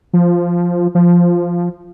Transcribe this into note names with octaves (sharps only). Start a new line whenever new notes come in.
F3
F3